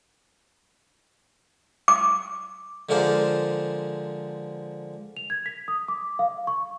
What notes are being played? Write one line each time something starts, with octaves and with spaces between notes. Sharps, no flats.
D6
D3 F3 G#3 A#4 C5 D5
F7
G#6
B6
D#6
D6
F5
C#6